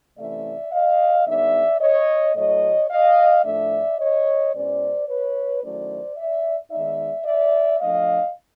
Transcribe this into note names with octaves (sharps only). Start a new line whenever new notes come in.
C3 E3 A3 C#4 E4 D5 E5
D#5 F5
D3 G3 B3 D#4 D5 E5
C#5 D#5
A2 F#3 A3 C#5 D#5
D#5 F5
A2 F3 A3 D4 D5 E5
C#5 D#5
B2 G#3 C#4 E4 C5 D5
B4 C#5
D#3 F#3 A3 C#4 E4 C5 D5
D5 E5
D#3 G#3 B3 D#4 D5 E5
D5 E5
F3 A3 D4 D#5 F5